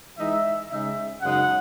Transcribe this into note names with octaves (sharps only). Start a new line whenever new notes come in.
E3 G#3 D#4 E5
C#3 G#3 D#4 E5
F#2 C#3 G#3 D#4 F#5